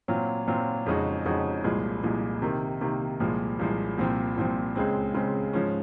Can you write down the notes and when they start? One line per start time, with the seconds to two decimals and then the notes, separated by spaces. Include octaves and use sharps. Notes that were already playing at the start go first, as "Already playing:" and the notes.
0.08 A#2 F#3 C4 F4
0.47 A#2 F#3 C4 F4
0.86 F2 C#3 G#3 D#4 F#4
1.26 F2 C#3 G#3 D#4 F#4
1.64 C2 A#2 F3 G#3
2.03 C2 A#2 F3 G#3
2.42 C3 D#3 A#3
2.81 C3 D#3 A#3
3.20 C2 A#2 F3 G#3
3.59 C2 A#2 F3 G#3
3.98 C2 A#2 F3 C4
4.37 C2 A#2 F3 C4
4.76 C#2 C#3 G#3 C4
5.14 C#2 C#3 G#3 C4
5.53 G#2 F3 G#3 C#4